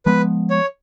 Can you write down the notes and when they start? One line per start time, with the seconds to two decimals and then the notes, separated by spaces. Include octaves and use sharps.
0.06 F3 G#3 B3 B4
0.50 C#5